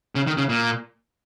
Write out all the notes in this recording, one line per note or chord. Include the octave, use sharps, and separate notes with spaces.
C#3
D#3
C#3
A#2